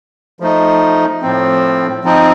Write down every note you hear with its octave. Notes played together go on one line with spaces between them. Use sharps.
F3 A3 D#4
A2 F3 C4
F3 C4 D#4